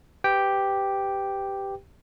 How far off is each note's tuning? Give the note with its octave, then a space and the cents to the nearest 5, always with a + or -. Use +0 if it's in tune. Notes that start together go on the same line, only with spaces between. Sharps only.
G4 +0 B4 +25 G5 +0